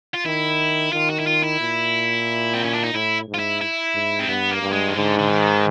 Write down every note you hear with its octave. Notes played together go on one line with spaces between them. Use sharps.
F4
D#3 E4
D#3 F4
F#4
E4
F4
E4
A#2
C4
C#4
D4
D#4
A2 E4
G#2
F4
E4
E4
G#2
C4
G2 B3
A#3
G2
G#3
D#3
G#2 D3
D3
D#3